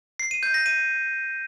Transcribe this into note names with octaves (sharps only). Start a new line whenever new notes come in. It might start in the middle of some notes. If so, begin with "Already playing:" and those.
C7
D#7
G6
A#6
D#7